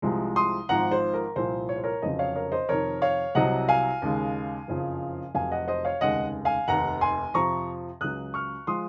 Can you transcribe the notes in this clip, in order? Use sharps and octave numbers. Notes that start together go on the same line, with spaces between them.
C2 C3 F3 G#3
C6 D#6
G#1 G#2 F3 F#5 A#5
C5
A#4
C2 A#2 F3 C5
C#5
C5
A#4 C#5
F1 F2 C#3 F#3 C5 D#5
C#5 F5
A#4 C#5
C5 D#5
F2 C3 D#3 A#4 C#5
C#5 F5
C2 C3 F#3 D#5 F#5
F5 G#5
D#2 C#3 G#3
F#1 F2 C#3 F3
F1 F2 C3 F#3 F5 G#5
D#5 F#5
C5 D#5
C#5 F5
F1 D#2 C#3 G#3 D#5 F#5
F5 G#5
F1 D#2 D#3 F#5 A#5
G#5 C6
F2 C3 F3 A#5 C#6
C#2 C#3 F#3 D#6 F#6
C#6 F6
F3 G#3 C6 D#6